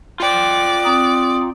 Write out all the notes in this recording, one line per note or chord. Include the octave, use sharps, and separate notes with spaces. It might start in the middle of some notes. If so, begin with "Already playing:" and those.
F4 D5 G5
C4 A#5 D#6